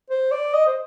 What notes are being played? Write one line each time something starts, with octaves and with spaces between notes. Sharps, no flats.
C5
D5
D#5
C5